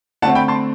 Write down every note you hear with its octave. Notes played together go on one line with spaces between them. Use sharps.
D3 A3 C4 F#5 A5
G5 B5
A5 C6